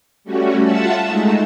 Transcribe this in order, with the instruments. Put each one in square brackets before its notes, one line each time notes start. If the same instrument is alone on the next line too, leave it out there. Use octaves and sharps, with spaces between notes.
[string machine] G3 A3 C#4 F#4
F4 E5 F#5 A5 E6
G#3 A3 D#4